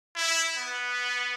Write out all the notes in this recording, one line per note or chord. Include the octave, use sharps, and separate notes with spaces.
E4
B3